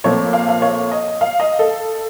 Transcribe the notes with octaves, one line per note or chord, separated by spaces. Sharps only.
A#2 F3 A3 C4 C#5
F5
F5
C#5
D#5
F5
D#5
A4